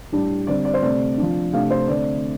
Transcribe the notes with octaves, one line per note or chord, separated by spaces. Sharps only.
A2 G3 D4
D3 G3 C4 D5
D5
C5
C3 A3 C4 D5
F3 D4
C3 A3 D4 F5
C5
D3 A3 C4 D5